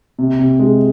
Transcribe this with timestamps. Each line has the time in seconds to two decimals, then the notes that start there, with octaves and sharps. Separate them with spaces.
0.19 C3
0.39 C3
0.59 G#3